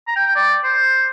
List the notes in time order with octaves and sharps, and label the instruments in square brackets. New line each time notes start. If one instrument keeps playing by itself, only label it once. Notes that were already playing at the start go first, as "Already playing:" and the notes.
[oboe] A#5
G5
G5
D5
C5